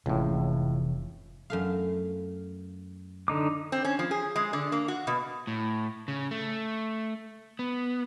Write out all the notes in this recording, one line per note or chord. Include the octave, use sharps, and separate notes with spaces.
F1 C#2 A2 C3 E3
F#2 A3 F5
D3 D#4 D6
C4
C#4
F3
G#4
G#3
D3
A#3
F#4
B2
A2
C#3
A3
B3